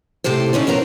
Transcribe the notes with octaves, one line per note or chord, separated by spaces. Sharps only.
A2 C3 G4 A4 C5
D3 C#4 D#4 E4
F2 B3 A#4 C5 A#5